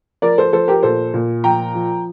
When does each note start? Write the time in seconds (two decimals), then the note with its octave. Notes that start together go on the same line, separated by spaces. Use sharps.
0.22 F3 A#4 D5
0.38 A4 C5
0.53 F3 A4 C5
0.68 G4 A#4
0.83 A#2 A4 C5
1.14 A#2
1.44 F3 G5 A#5
1.75 F3